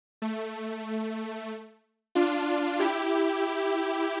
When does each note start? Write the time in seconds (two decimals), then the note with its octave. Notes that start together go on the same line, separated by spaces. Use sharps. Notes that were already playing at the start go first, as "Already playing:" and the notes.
0.22 A3
2.15 D4 F4
2.80 E4 G4